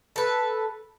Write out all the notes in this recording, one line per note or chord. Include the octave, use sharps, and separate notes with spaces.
A4 B4